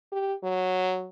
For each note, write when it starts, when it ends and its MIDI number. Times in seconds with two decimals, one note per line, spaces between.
0.12 0.34 67
0.43 1.09 54